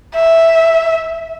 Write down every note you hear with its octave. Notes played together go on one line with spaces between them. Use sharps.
E5